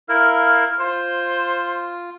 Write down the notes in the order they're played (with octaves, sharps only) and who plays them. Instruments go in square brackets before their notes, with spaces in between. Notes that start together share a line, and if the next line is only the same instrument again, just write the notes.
[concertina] E4 A#4 [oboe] F5
[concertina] F4 [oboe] C5